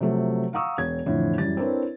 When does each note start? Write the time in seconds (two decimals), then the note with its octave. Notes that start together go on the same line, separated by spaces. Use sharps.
0.01 C3 F3 F#3 A3
0.53 F5 F#5 A#5 C#6 D#6 E6
0.78 E1 C#5 G#6
1.06 F2 A2 D3 E3 F3
1.38 F#2 E3 G3 A6
1.57 C4 D4 E4 A#4 B4 C#5